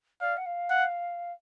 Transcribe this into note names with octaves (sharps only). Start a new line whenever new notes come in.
D5 F5
F#5
F5
F#5